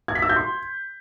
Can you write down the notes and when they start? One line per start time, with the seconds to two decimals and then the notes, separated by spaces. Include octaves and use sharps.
0.08 G#6
0.15 B6
0.22 E6
0.29 G6
0.36 C6